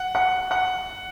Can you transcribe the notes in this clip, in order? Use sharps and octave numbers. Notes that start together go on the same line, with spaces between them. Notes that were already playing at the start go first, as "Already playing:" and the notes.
Already playing: F#5
F#5
F#5